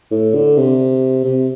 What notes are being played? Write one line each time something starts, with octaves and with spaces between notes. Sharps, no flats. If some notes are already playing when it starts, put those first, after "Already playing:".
A2
D3
C3
C3